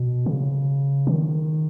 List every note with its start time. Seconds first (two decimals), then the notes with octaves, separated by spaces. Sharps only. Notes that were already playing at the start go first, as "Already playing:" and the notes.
Already playing: B2
0.26 C#3
1.07 D#3